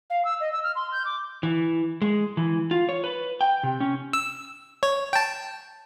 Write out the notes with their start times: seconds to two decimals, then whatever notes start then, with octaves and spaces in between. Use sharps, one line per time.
0.10 F5
0.25 E6
0.40 D#5
0.52 E6
0.63 F6
0.75 C6
0.92 G6
1.05 D6
1.43 E3
2.02 G#3
2.37 E3
2.71 F4
2.89 C#5
3.04 B4
3.41 G5
3.63 C3
3.80 C#4
4.13 E6
4.83 C#5
5.13 G5 A5